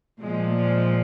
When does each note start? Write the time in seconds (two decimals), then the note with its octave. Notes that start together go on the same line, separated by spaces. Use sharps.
0.20 A#2 F3 G#3
0.56 G#3